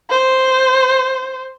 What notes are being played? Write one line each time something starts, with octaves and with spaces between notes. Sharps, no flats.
C5